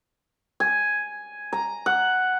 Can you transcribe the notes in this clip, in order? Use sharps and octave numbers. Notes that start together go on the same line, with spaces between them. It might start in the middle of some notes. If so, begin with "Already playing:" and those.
G#5
A#5
F#5